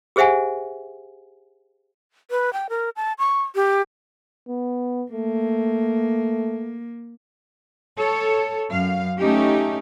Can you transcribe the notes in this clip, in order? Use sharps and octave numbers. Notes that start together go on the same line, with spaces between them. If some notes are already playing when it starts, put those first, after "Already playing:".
G4 G#4 C5 E5 F#5 G#5
B4
G5
A#4
A5
C#6
G4
B3
A3 A#3
A4 C#5
F#2 F5
A3 C#4 D#4 G4